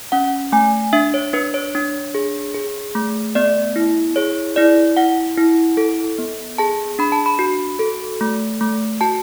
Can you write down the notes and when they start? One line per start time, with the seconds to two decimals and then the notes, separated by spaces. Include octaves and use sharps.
0.12 C#4 F#5
0.52 A3 G#5
0.93 D4 E5
1.14 C#5
1.33 D4 B4
1.54 C#5
1.75 D4
2.15 G#4
2.55 G#4
2.95 A3
3.35 B3 D5
3.76 E4
4.16 G#4 C#5
4.56 E4 D5
4.97 E4 F#5
5.38 E4
5.77 A4
6.18 B3
6.58 G#4 A5
6.99 D4 B5
7.12 A5
7.26 B5
7.39 F#4
7.79 A4
8.21 A3
8.61 A3
9.01 F#4 A5